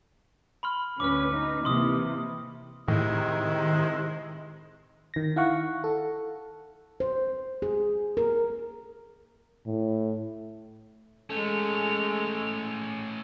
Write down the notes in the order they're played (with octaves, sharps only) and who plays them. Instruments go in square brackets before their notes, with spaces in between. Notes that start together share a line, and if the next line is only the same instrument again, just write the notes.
[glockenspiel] B5 C6 F6
[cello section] D2 C#4 B4 [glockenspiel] D6 F6
[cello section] D#4
[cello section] C3 E3 A#3 [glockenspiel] C6 D#6
[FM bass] A2 [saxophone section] C3 G#3 E4 [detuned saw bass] D#3
[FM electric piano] D#3 A#6
E4 F5 F#5 C#6
A4
[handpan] C5
G#4
A#4
[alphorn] A2
[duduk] G#3 [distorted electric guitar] A3 C#4 [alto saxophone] A4 [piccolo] F7